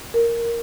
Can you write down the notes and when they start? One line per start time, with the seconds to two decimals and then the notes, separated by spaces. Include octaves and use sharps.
0.14 A#4